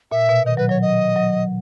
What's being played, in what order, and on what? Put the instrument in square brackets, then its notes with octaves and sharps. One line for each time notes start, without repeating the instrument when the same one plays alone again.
[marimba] A#2 [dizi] E5
[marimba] B2
[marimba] D#3 [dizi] D#5
[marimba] F#3 [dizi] B4
[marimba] F#3 [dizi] C#5
[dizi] D#5
[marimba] F#3